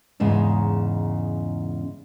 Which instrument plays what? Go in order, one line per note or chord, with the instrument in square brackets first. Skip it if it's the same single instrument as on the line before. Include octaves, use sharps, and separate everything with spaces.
[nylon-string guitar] E2 G#2 C#3 D#4